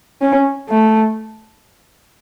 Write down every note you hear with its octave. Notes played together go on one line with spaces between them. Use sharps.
C#4
A3